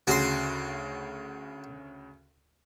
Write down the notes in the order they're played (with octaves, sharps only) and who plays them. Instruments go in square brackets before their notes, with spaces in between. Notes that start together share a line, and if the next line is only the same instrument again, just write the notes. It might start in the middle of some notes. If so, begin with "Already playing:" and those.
[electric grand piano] D2 C#3 [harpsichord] F#4 C6